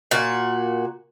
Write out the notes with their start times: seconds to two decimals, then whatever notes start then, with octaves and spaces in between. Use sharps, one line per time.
0.11 A#2 F#4